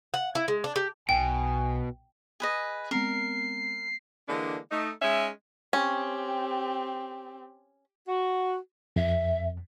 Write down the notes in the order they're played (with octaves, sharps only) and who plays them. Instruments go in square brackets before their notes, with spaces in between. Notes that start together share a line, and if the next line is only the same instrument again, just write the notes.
[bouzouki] F#5
E4
G#3
D4
G4
[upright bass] B1 [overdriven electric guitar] B2 [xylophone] G5 [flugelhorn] G#5
[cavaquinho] G#4 B4 D#5
[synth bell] G#3 B3 C4 [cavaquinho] A#4 [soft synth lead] C7
[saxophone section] D3 E3 G#3 A#3 D4
A3 D#4
G#3 C#4 D#4 E5
[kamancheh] C4 G4 [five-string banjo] C#4
[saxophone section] F#4
[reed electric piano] F2 [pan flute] E5